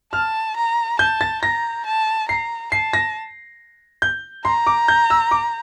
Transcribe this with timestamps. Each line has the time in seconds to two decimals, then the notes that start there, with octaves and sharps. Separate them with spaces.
0.13 A5 F6
0.56 A#5
0.99 A5 G6
1.21 A6
1.42 A#5 A#6
1.85 A5
2.29 A#5 C7
2.72 A5 C7
2.93 A#6
4.02 G6
4.45 A#5 C6
4.67 D6
4.88 G6
5.10 E6
5.31 D6